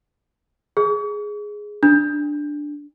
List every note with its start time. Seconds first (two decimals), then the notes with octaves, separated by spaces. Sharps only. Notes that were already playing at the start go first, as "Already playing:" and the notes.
0.77 G#4
1.83 D4